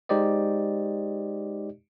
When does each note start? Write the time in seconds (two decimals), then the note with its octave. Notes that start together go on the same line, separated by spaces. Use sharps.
0.09 G#3 D#4 G4 C5 D5 D#5